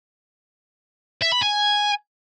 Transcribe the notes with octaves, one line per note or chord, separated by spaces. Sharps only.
E5
B5
G#5